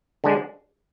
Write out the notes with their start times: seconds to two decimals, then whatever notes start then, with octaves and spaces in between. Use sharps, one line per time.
0.24 D3 G#3 D4